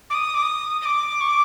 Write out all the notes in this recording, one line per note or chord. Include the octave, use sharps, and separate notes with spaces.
D6
D#6
D6
D#6
D#6
D6
C#6
D6